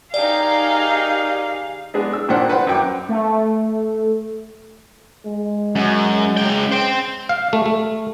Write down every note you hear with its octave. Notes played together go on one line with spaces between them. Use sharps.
D#3 D#4 G4 G#4 D5 F5
G#3 B3 D4 G#4
E6
G2 A#2 D#3 D4 C5 F#5
B4 C5 F#5
F#2 G5 D6
A3
G#3
F#2
C#3 G5
C5 G5
F5
A3
A3